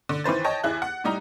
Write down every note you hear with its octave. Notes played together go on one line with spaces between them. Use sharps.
D3
D#3 E3 B4 C5 A6
C#5 D#5 G5 A5
D#2 E4 G#4 F#6
F#5
A2 G3 D#4 A#5